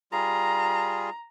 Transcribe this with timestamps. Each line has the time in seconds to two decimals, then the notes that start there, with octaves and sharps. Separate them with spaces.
0.12 G3 F4 G#4 A#5